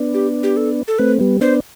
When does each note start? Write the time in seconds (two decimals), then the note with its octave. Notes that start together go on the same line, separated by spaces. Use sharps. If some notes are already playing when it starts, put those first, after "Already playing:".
Already playing: B3 D4
0.14 G4
0.43 G4
0.57 A4
0.88 A4
0.99 A3 C4 B4
1.20 G3 B3
1.41 B3 D4 C5